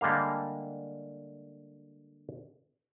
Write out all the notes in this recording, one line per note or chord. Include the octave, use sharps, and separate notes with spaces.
D3 G3 G#3 A#3 F5